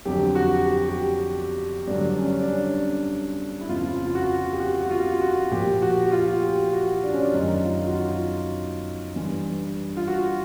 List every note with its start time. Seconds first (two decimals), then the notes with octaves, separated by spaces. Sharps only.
0.05 F2 D3 F#3 G4
0.35 F#4
0.66 G4
0.77 F#4
0.88 G4
1.87 G2 D3 F#3 D4
2.18 C#4
2.41 D4
2.48 C#4
3.61 E4
3.69 F2 C#3 F3 F4
4.06 F4
4.15 F#4
4.53 G4
4.60 F#4
4.81 F#4
4.91 F4
5.21 F#4
5.51 A#2 F3 G4
5.82 F#4
6.04 F#4
6.12 F4
6.42 G4
6.73 F#4
7.04 D4
7.12 C#4
7.20 D4
7.33 F#2 D#3 F#3 D#4
7.64 F4
7.87 F#4
7.95 F4
9.16 G2 E3
9.97 F4
10.08 F#4